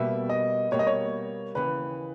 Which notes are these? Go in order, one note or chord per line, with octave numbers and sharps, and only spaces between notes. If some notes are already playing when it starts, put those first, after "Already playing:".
Already playing: B2 G3 A#3 E5
D#5
B2 G3 A#3 C#5
D#5
C#5
D#2 C#3 E3 B4